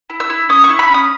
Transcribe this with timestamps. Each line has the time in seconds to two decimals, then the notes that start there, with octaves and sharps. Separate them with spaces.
0.10 E4
0.20 E6
0.30 E4
0.49 C#4 D#6
0.64 C#6
0.69 E4
0.79 B5
0.89 C#4
0.94 D#6